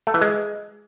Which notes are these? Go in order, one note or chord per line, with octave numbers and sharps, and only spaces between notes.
A3
E3
G#3